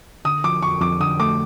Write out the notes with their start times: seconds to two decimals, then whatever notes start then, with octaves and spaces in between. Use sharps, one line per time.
0.25 D3 D#6
0.44 F3 D6
0.62 F2 C#6
0.81 F2 D6
1.00 D3 D#6
1.20 A3 D6